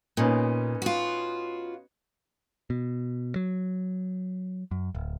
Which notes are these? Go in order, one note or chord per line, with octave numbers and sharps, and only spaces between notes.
A#2 B3 C#4 D#4
F4 F#4
B2
F#3
F#2
D1